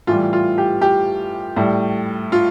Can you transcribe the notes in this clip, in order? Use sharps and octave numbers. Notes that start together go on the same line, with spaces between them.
A2 E3 G3 F4
F4
G4
G4
A2 G3
F4